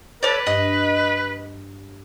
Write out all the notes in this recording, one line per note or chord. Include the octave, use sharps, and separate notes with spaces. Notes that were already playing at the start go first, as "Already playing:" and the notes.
A4 B4 C#5 D5
G2 D#5